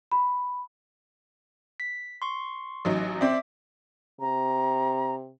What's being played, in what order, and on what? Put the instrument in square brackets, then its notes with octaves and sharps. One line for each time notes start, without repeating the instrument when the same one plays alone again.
[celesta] B5
[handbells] B6
C6 C#6
[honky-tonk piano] A1 F#3 D#4
[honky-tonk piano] C4 D5 [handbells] E5 D6
[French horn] C3 [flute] A#5